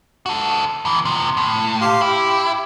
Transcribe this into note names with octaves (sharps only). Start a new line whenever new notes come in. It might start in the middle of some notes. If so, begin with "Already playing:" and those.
F#4 A4
A#2 E3
C3 F3
A2
G4 F5 C6
E4 G4